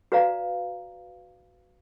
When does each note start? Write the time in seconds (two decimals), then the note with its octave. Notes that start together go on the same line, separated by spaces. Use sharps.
0.12 F#4 B4 D5 F5 A#5